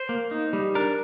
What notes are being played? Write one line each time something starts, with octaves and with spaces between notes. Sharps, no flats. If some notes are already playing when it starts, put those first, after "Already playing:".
Already playing: C5
A#3
D#4
G3
D4 A#4